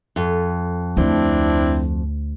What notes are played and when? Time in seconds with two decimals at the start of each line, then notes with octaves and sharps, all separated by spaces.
0.16 F2
0.97 D2 C4 D4 E4